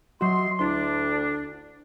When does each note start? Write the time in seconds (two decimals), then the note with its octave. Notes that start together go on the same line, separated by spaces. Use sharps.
0.21 F#3 F#4 D#5 E5 C6
0.59 D2 D4 E4 C6